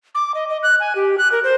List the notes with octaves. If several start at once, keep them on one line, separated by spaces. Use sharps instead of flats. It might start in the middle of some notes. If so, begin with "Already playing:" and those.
D6
D#5
D#5
F#6
G#5
G4
F#6
A#4
C5